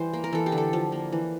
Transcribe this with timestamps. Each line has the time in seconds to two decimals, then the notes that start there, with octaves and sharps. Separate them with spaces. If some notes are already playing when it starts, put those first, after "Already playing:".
Already playing: E3 G3 C5
0.13 A#3
0.24 A#4
0.33 E3 A4
0.46 G4
0.52 D3
0.58 A4
0.73 F3
0.92 A#3
1.12 E3